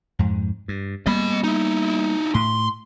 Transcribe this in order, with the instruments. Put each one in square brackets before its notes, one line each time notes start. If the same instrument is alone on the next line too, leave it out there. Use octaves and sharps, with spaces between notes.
[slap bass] F2 G#2
G2
[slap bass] G3 A#3 B3 [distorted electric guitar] D#5 B5
[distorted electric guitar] D#4 E4
[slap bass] A2 [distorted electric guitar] C6